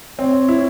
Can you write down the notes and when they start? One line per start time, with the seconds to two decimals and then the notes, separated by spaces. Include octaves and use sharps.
0.19 C4 C#5
0.49 E4